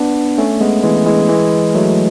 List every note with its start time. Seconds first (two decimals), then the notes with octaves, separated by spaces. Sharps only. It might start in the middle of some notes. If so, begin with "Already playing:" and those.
Already playing: B3 D4
0.38 A3 C#4
0.61 G#3 B3
0.83 E3 G#3
1.06 E3 G#3
1.29 E3 G#3
1.75 F#3 A3